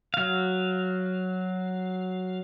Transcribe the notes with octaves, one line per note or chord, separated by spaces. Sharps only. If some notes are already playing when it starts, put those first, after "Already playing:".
F#3 F5